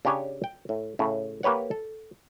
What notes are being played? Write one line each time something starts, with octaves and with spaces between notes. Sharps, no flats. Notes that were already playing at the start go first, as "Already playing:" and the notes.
C#3 D4 G4 C#5 G#5
G5
A2
A2 C#3
A#3 G4 B4 C#5 F#5
A4